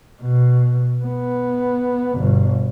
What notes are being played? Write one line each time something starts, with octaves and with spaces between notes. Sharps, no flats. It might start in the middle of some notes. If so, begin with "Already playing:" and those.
B2
B3
G1 B2